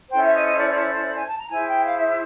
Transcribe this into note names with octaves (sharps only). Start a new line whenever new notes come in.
C#4 E4 A4 C5 G5
E5
D#5
D#5
D5
D5
D5
G#5
A5
A#5
E4 G#4 C5 G#5
G5
F5
E5
E5